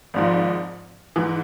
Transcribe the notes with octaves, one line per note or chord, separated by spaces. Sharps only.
G#1 G#2 F3
G#2 E3